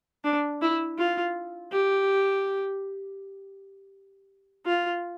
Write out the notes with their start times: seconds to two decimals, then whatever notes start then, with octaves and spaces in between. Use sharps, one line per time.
0.24 D4
0.62 E4
0.98 F4
1.72 G4
4.66 F4